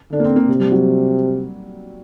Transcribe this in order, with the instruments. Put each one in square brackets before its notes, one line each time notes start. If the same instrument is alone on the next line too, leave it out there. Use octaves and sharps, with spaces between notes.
[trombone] D3 [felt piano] D4
[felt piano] A#3
C4
A#3
[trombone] C3
[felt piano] G3
F#3